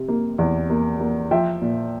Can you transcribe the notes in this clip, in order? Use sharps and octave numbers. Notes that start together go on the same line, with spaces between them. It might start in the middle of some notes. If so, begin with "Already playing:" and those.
Already playing: C3
A#3
E2
A#3
A#3
F3 E5 G5
A#2